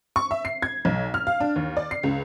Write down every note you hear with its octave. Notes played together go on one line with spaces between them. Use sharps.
C#6
E5
C7
G#6
B1
F6
F5
D4
D#2
D5
C7
C#2